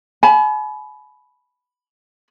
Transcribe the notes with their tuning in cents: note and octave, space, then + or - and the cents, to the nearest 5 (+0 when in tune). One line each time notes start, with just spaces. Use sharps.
G#5 +40 B5 +0